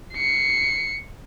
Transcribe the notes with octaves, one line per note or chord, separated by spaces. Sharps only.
C7 C#7